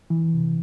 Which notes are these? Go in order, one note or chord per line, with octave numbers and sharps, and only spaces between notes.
E3
C3